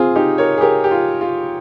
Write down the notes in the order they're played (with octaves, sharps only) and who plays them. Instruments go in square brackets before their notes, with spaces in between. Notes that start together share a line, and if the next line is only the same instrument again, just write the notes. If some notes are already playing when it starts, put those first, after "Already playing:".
Already playing: [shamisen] C4 [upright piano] F4 G#4
[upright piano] D#4 G4
A#4 C#5
G#4
G4 A#4
G4
F4
F4